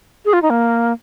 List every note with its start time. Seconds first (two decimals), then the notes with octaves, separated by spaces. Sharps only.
0.25 G#4
0.33 F4
0.42 D#4
0.50 A#3